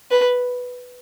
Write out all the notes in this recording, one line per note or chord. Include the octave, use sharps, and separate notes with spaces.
B4